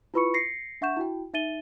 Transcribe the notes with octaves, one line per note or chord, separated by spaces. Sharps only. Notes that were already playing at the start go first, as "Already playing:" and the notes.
E4 F4 B4 B5 C#6 C#7
A#6 C7 C#7
D4 E5 F#5 C#6 G6 E7
E4 F#4 G5
D#4 E5 A6 D#7 G7